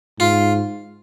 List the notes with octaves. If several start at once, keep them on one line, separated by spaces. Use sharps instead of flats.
G#2 F4